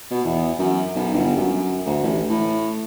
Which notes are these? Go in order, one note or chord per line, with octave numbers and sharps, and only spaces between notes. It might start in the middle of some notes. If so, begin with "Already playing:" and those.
B2
E2
F#2
B1
G1
F#2
D2
A1
A2